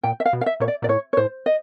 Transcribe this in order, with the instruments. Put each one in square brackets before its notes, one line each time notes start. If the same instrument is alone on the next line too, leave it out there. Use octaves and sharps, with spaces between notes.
[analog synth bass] A#2 [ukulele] G5
[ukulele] E5
F5
[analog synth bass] B2
[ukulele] F5
E5
[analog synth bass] A#2 [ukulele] C#5
[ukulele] D5
[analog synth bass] A#2 [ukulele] D5
[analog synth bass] A2 [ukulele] C#5
[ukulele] C#5
[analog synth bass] A2 [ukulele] C5
[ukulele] D#5